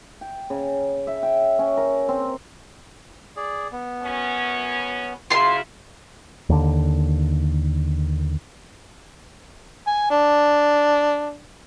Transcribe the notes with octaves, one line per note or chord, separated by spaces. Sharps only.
G5
C#3
E5
G5
C#4
A#4
C4
G#4 D5
B3
F#2 C#4
C#3 F#3 E4 F4 C6
D#2 D3
G#5
D4